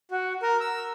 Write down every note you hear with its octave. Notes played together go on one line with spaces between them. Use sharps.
F#4
A#4
E6